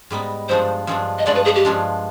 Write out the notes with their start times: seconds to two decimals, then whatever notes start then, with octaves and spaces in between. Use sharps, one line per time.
0.10 G#2 G3 B3 D#4
0.49 G2 F3 G#3 D4 C5
0.87 G2 F3 G#3 D4
1.19 D#5
1.26 G2 F3 G#3 D4 D5
1.35 B4
1.45 G#4
1.56 G4
1.65 G2 F3 G#3 D4